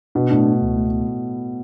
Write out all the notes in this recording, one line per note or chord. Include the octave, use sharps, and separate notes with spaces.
B2 D4
A2 D4
B3
C#2
A3